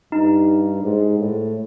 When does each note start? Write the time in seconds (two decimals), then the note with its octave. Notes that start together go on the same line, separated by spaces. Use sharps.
0.12 G2 D#4
0.83 G#2
1.18 A2